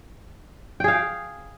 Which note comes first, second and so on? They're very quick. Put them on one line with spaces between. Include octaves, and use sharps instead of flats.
G5 G#4 F5